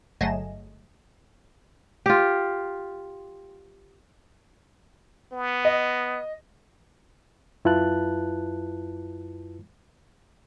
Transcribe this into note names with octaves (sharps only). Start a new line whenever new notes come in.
G1 F#3 A3 G#4 D#5 E7
F4 G4
B3
D#5
F#2 E4 F4 B4 A5 F#6